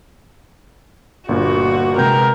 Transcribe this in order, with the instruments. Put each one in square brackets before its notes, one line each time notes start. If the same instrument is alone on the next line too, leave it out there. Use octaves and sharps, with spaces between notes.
[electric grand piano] G1 A#2 [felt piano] D4 [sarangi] F#4
[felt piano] C3 G#3 [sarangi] A#4 [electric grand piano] B4 G5 G6